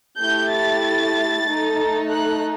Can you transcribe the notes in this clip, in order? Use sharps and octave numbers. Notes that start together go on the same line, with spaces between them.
A3 E4 G4 G6
A6
A3 D#4 A4
F#6